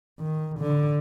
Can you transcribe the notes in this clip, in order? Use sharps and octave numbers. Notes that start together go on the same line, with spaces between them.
D#3
D3